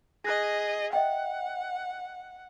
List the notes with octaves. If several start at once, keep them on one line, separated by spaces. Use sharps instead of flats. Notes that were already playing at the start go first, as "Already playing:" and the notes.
G#4 D#5 F#6 A#6
D#5 E5 F#5 G5